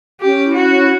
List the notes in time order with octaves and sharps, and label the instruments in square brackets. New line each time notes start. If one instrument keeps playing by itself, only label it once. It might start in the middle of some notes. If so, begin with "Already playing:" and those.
[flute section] C#4 [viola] G4
[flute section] E4
[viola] F#4
[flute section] C#4